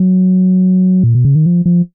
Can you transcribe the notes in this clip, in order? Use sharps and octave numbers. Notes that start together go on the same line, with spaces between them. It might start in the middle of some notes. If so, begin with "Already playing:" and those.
Already playing: F#3
A#2
B2
C#3
D#3
F3
F3